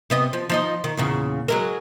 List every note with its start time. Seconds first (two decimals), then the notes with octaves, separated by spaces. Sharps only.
0.10 C3 B3 D#5
0.33 F3
0.50 F3 D#4 D#5
0.84 D#3
0.97 E2 A#2 C#3
1.48 F#3 G#3 A#4